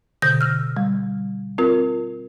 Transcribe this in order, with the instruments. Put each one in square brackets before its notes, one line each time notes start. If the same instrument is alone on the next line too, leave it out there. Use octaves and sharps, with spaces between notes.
[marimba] B2 D3 G6 A#6
E6 F6
G3
C4 F4 A#4